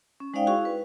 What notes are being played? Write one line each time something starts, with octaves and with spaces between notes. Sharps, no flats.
C#4
G#3 D#4 C5 D5 F5 G5
E4 F#4 G#4 F5 C#6
B4